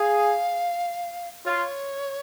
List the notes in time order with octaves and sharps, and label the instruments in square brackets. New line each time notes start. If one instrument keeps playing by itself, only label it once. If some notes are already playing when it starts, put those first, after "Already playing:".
Already playing: [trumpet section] G#4 [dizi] F5
[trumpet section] F4 [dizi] C#5